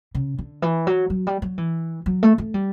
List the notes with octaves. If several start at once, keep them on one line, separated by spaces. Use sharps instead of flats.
C#3
D3
E3
F#3
F#3
G3
F#3
E3
F#3
A3
A3
G3